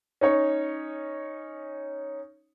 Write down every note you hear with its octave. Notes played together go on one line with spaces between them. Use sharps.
C#4 D#4 C#5